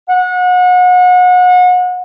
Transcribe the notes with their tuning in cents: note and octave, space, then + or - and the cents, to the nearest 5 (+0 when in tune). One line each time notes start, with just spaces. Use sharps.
F#5 -35